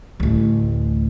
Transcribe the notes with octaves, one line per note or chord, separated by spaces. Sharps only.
A1 D2